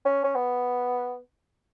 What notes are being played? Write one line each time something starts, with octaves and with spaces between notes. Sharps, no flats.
C#4
C#4
B3